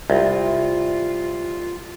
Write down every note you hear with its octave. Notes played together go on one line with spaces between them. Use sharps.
C2 F4